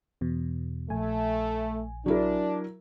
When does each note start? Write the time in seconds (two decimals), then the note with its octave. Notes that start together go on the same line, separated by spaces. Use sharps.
0.21 E2 B2
0.90 A#1 A3 G#5
2.06 F#3 D4 E4 A#4